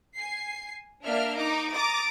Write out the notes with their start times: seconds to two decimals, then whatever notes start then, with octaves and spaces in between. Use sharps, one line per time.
0.16 G#5 C7
1.04 A#3 D4 E5 F6
1.36 D#4 A#5 D6
1.73 A#5 D6 D#6 A6